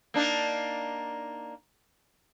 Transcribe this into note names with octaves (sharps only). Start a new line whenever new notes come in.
A#3 D4 D#4